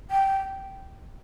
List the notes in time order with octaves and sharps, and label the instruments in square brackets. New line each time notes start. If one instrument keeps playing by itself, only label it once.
[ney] G5